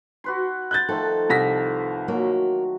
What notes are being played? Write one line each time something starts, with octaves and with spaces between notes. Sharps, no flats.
F#4 B4 C6
F#6 G6 A6
D#3 F3 A3 A4
C2 A#6 B6
F#3 A#3